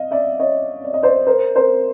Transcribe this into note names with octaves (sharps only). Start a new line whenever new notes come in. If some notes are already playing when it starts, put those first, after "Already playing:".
Already playing: D#5 F5
D5 E5
C#5 D#5
D5
D#5
C5 D5
A#4 C5
A#4 C5